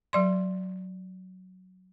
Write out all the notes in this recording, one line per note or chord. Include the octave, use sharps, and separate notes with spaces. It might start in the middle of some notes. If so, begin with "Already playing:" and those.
F#3 D5 C6